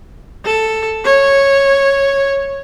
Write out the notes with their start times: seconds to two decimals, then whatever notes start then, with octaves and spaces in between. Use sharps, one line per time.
0.45 A4
1.05 C#5